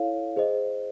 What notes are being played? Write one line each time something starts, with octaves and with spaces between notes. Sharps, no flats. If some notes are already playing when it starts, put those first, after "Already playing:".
Already playing: E4 A4 C#5 F5
G#4 C5 D#5